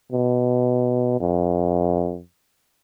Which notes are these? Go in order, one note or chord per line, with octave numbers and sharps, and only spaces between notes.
B2
F2